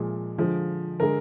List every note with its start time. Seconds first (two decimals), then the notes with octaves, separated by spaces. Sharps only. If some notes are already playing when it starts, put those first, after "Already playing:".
Already playing: A#2 F3 G#3
0.38 D3 F3 G#3
1.00 D3 G#3 A#4